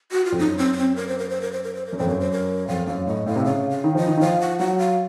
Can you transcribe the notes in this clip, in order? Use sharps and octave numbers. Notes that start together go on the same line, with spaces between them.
F#4
F4
F2
F#2 D#4
C4
C#4
C4
A#4
C5
A#4
C5
A#4
C5
A#4
C5
A#4
F#2
F2 C5
F#2 A#4
C5
A#4
F2 F5
F#2 F5
A2 D#5
A2 F5
C3
C#3 F5
F5
D#3
F3 D#5
D#3
D#3
F3 F5
F#5
F#3 F#5
F5